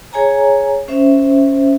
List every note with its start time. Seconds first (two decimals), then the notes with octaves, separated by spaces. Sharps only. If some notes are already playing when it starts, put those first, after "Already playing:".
0.13 G#4 C#5 G#5 A#5
0.88 C#4 C5 E5